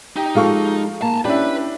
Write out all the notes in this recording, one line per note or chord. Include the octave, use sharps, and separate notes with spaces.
D#4 G4
F3 G#3 G4 A4 F5 C#6
A#3 A5 A#5
C#4 D4 E4 G4 B4 B5